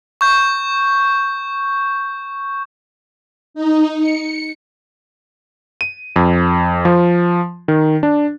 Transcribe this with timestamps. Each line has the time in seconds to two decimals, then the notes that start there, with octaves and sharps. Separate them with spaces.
0.21 C#6 G6
3.54 D#4
4.00 C#7
5.81 D#7
6.16 F2
6.85 F3
7.68 D#3
8.03 D4